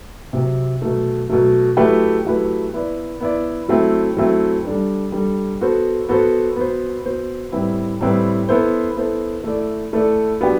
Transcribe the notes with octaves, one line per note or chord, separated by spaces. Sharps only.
C3 F#3 C4
B2 F#3 A3
B2 F#3 A3
F#3 A3 E4 G4 B4
F#3 A3 E4 G4 B4
B3 E4 B4 D5
B3 E4 B4 D5
F#3 A3 C4 E4
F#3 A3 C4 E4
G3 D4 A4
G3 D4 A4
B3 F#4 A4 C5
B3 F#4 A4 C5
B3 F#4 C5
B3 F#4 C5
A2 G3 C4 E4 B4
A2 G3 C4 E4 B4
B3 E4 A4 C5
B3 E4 A4 C5
A3 E4 A4 D5
A3 E4 A4 D5
F#3 B3 D4 G4